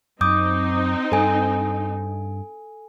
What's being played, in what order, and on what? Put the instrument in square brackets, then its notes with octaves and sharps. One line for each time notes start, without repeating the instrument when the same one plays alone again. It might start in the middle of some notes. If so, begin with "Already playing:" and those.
[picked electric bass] F#2 [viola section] C4 D#4 [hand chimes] D6 D#6 G6
[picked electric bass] G2 [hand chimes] A4 G#5